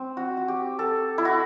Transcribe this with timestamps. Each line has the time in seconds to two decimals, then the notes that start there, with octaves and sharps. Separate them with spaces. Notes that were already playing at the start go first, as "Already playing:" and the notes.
Already playing: C4
0.17 F#4
0.37 F#4
0.48 G4
0.79 A4
1.18 E4
1.25 F#4